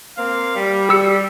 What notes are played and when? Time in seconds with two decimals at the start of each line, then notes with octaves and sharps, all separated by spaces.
0.17 A#3 C4 F5
0.56 G3
0.89 G4 E6 C#7